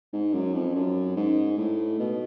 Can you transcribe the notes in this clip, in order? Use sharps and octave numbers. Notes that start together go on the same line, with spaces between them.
G#2
F#2
F2
F#2
G#2
A2
B2